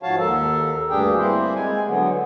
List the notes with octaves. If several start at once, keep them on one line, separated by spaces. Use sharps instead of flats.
G#2 F3 F#4 C#5 F5 A5
D#2 A4 A#4
D2 G2 D4 G4 G#4 G5
G3 A#3 C4 E4 C5
G#3 G#5
D3 F#3 B3